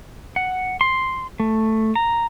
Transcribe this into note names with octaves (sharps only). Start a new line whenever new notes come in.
F#5
C6
A3
A#5